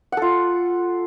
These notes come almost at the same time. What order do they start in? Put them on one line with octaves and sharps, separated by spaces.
F#5 A4 F4